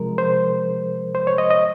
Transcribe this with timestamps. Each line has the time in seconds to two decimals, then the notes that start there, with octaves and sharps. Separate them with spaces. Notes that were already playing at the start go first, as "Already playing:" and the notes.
Already playing: C3 F3 G#3 A#4
0.18 C5
1.15 C5
1.27 C#5
1.38 D#5
1.51 D#5